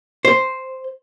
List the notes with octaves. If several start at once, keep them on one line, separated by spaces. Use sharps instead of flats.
C5